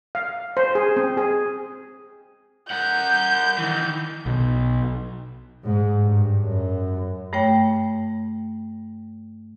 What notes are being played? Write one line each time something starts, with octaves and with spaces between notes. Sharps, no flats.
F5
C5
G#4
C4
G#4
A#4 F#5 G6
D#3 E3
B1
G#2
G2
F#2
G2 A3 C#5 G5